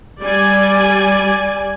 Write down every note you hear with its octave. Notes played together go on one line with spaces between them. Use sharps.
G3 D5 G#5